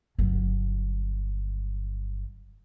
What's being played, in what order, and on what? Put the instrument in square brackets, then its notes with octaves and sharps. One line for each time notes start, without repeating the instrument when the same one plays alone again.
[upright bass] G1 F#3